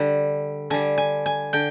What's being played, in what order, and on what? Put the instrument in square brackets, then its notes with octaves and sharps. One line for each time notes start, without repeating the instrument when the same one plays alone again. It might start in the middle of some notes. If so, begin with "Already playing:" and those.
Already playing: [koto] D3 G3
D3 G3 G#5
G#5
G#5
D3 G5